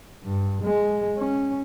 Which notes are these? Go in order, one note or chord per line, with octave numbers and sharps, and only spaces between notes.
G2
G#3
C#4